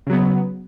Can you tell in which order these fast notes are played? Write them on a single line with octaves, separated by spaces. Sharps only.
C#3 F#3 B3